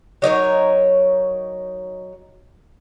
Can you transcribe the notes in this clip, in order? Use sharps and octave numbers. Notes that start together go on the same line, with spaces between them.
F#3 D#4 A#4 C#5